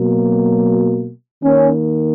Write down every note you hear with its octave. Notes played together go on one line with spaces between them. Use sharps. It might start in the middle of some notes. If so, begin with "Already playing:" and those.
Already playing: B2 F#3 A#3
D#3 A#3 C#4